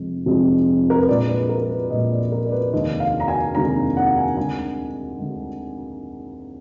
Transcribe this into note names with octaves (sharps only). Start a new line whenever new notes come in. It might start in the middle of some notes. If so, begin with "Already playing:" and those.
Already playing: F1 F2 F3 G#3
F1 F2 F3 G#3
A#4
B4
A#1 A#2 G#3 D5
B4
A#4
B4
A#1 A#2 G#3 D#5
D5
A#4
D5
B4
F1 D#2 D3 G#3 D#5
F5
A#5
G#5
F1 D#2 D3 G#3 A#5
F#5
G#5
D2 D3 G#3 G#5
D2 D3 G#3